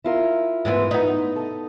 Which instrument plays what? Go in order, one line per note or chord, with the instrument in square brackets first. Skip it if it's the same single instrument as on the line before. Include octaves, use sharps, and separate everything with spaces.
[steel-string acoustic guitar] E4 F4 A#4
[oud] G#2 E3 B3
B3 D#4
[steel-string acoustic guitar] A4 D#5